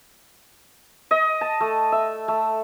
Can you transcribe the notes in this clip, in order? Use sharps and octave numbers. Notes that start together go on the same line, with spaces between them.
D#5
A5
A3
E5
A3